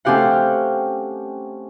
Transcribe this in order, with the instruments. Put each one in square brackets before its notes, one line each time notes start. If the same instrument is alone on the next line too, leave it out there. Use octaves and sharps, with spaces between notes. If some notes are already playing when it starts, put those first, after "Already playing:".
[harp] A3 C4 C#4 G4 F5 F#5